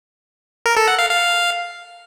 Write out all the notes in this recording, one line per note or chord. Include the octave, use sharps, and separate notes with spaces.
A#4
A4
F#5
F5
F5